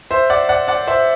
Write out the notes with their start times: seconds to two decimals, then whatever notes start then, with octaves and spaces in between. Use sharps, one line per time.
0.11 C5 E5
0.30 D5 F#5
0.49 D5 F#5
0.68 D5 F#5
0.87 C5 E5